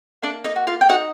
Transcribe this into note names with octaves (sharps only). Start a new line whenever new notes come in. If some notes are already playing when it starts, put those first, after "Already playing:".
A#3 D4 D5
D#4 D#5
F#4
F4 F5
G5
D#4 F#4 F#5